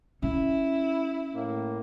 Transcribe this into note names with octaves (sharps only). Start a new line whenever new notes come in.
C#4 E4
A2 A#3